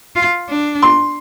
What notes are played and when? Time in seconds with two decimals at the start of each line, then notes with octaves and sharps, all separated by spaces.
0.16 F4
0.49 D4
0.82 C6